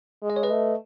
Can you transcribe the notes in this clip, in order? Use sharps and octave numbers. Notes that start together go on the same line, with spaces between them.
G#3
D#5
C#5
B4 D#5
A3